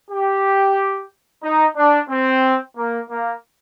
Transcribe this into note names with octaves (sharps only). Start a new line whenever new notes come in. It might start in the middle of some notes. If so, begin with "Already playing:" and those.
G4
D#4
D4
C4
A#3
A#3